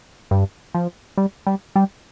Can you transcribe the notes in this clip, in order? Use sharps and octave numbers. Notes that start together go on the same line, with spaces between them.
G2
F3
G3
G3
G3